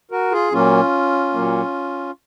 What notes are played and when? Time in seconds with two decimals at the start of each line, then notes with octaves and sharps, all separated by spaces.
0.11 F#4 A#4
0.32 F4 G#4
0.52 A#2 F#3 A#3 C#4 F4
1.33 A#2 F#3 A#3